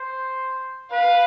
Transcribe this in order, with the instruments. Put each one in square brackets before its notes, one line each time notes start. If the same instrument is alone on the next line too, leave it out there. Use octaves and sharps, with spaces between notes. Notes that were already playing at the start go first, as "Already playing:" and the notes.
Already playing: [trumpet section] C5
[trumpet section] B4 [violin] F5